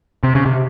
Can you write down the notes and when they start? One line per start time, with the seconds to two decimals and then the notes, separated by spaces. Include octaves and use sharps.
0.23 C3
0.35 C#3
0.46 C3